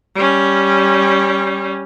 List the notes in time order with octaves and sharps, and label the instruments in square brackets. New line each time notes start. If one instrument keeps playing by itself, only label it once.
[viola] G3 C#4